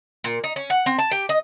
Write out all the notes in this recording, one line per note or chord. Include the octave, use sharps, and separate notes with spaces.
A#2
D#4
C#4
F#5
C4
A5
G4
D#5